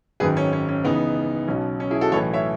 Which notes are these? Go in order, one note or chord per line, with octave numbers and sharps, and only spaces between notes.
G#1 F#2 D#3 G#4 B4
C#4
C#4
C#4
C#2 C#3 E3 B3 D#4
B1 B2 C#4
C#4
E4 G#4
F#4 A4
B1 A2 E3 A4 C#5
C#5 E5